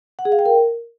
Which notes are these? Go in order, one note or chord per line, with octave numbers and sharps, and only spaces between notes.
F#5
G#4
F5
G5
A#4